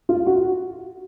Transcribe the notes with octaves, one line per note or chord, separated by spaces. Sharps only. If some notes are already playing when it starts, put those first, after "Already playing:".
F4
F#4